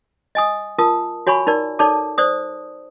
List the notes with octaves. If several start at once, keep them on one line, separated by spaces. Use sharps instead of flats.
D#5 G#5 D#6
F4 A#4 A5 D#6
F#4 C#5 G#5 B5 C#6
D#4 A#4 D5
D#4 A4 C#5 D5 A5 D6
C5 D5 D#6